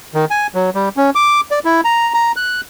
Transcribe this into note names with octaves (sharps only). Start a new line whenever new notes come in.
D#3
G#5
F#3
G3
C#4
D6
D5
E4
A#5
A#5
F#6